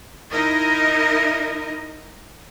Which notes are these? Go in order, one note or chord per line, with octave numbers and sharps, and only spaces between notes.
D#4 E4 A#4 D#5